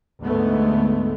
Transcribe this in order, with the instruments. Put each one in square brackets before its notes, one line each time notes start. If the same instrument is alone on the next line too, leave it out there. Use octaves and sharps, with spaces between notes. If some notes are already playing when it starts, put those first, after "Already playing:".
[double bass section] D2 G#2 D3 G#3 A3 B3